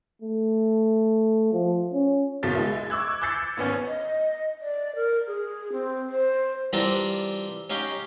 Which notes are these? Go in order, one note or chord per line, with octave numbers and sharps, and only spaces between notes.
A3
F3
C#4
F#1 B1 B2 F#3 A6
G#3 E4
C#6 D6 E6 F#6 G#6
D6 E6 G6 A6 C7 C#7
G#1 B3 C#4
D#5
D5
A#4
G#4
C4
C5
E3 G3 C4 D4 F4 A#4
C#4 D#4 G4 F5 G5